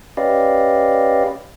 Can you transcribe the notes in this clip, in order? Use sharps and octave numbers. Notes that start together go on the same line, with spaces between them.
C#4 G4 B4 D5 D#5 F5